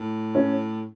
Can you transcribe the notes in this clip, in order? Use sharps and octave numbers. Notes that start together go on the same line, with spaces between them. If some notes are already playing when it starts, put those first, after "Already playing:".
Already playing: A2
C#4